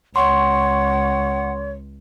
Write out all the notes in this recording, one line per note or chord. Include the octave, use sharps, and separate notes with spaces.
C#2 C#5 F#5 C6 C#6